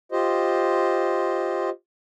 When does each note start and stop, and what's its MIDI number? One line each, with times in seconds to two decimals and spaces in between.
0.12 1.70 65
0.12 1.70 67
0.12 1.70 72
0.12 1.70 75